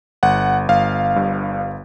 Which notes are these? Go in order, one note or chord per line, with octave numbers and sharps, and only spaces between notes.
G1 F#5
G1 F5
G2